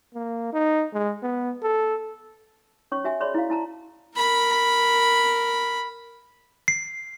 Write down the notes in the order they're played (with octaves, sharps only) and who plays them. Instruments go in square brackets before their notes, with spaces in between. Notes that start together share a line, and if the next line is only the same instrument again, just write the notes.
[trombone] A#3
D#4
G#3
B3
A4
[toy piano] C#4 C#5 C#6
F#4 E5 G#5
G#4 C#5 D5 B5 C6
E4 F5
E4 A5 A#5
[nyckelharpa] A#4 B5
[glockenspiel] C7